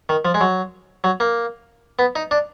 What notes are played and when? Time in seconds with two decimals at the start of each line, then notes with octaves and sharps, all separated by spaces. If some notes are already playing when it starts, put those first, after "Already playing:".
0.09 D#3
0.25 F3
0.34 G#3
0.41 F#3
1.04 F#3
1.20 A#3
1.99 B3
2.16 D#4
2.31 D4